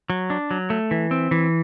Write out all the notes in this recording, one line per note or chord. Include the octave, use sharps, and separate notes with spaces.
F#3
D4
F#3
A3
E3
C4
E3